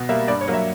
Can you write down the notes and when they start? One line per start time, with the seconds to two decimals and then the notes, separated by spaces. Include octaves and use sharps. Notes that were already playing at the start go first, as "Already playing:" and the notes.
Already playing: B2
0.09 G3 A#3 E5
0.28 G2 D5
0.41 C#5
0.48 F#3 A#3
0.54 E5